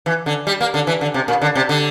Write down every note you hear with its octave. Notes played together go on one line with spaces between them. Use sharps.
E3
D3
G3
A#3
D3
E3
D3
C3
A#2
D3
C3
D3